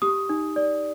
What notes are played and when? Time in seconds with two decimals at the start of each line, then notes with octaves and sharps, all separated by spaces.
0.02 G4 D#6
0.29 D#4
0.56 D5